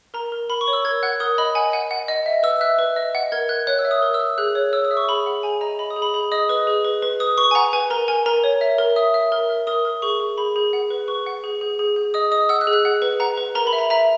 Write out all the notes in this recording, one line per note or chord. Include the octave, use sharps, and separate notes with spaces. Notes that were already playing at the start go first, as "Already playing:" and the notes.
A#4 A#5
A#4
A#4 B5
C#6
C#5
E6
A#4 G#6
F#5 F#6
A#4 D#6
D#5 B5
F#5 G#5
F#5 G#5
F#5
D#5
E5
B4 E6
E5 F#6
B4
D#5
F#5
A#4 G#6
A#4 F#6
C#5 F#6
E6
E5
D#6
A#4
E6
A#4
G#4 F#6
C#5
C#5 E6
D#6
E5
C#6
G#4 B5
F#5
G#4 G#5
D#5 A#5
D#5 B5
D#6
G#4
B5
G#4 B5
D#5 D#6
B4 D#6
G#4
B4
B4
B4 D#6
B4 C#6
G#5
F#5 A#5
B4 G#5
A#4 A#5
A#4 G#5
A#4 A#5
C#5
E5
A#4
E5 D#6
E5
A#4
A#4
A#4 D#6
A#4
G#4 C#6
G#4
G#4 B5
G#4
F#5
B4
B4 C#6
F#5
G#4
G#4
G#4
G#4
D#5 D#6
D#5 D#6
F#5 E6
F#6
G#4
F#6
F#5
B4
F#5 A#5
B4
A#4 A#5
B5
E5
A#5
E5 A#5